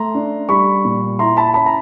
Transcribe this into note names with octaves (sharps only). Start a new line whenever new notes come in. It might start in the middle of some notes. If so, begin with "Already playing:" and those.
Already playing: A3 A#5 C6
D4
G3 B5 C#6
A#2
E4 A#5 C6
A5 B5
C#4 A5 B5
A#5